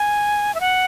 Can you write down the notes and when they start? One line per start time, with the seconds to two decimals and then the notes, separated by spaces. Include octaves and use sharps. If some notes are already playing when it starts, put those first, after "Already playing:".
Already playing: G#5
0.54 E5
0.60 F#5